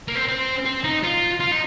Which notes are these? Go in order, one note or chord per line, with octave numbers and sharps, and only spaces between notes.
A#3
C4
C4
C4
D#4
F4
F4
D#4